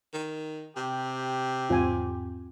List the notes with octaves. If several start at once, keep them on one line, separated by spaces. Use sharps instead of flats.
D#3
C3 G4
E2 G#2 C4 F4 G#5